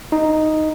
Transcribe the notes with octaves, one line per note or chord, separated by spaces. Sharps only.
D#4